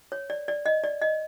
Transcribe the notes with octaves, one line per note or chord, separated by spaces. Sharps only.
C#5
D5
D5
D#5
D5
D#5